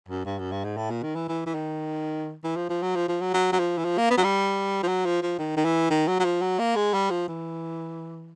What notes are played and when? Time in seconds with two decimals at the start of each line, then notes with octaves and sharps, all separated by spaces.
0.09 F#2
0.26 G2
0.39 F#2
0.52 G2
0.65 G#2
0.77 A2
0.90 A#2
1.03 D#3
1.16 E3
1.29 E3
1.47 E3
1.55 D#3
2.44 E3
2.57 F3
2.70 F3
2.83 F#3
2.96 F3
3.09 F3
3.22 F#3
3.34 F#3
3.53 F#3
3.59 F3
3.78 E3
3.85 F3
3.98 A#3
4.11 B3
4.18 F#3
4.24 G3
4.83 F3
4.88 F#3
5.06 F3
5.22 F3
5.39 D#3
5.57 D#3
5.65 E3
5.91 D#3
6.08 F#3
6.20 F#3
6.25 F3
6.42 F#3
6.59 A#3
6.76 G#3
6.94 G3
7.11 F3
7.28 E3